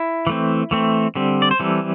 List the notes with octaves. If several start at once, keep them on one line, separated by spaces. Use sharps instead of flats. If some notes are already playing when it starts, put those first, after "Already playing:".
Already playing: E4
E3 A3 C4
E3 A3 C4
D3 G3 C4
D5
C5
E3 G3 C4 A4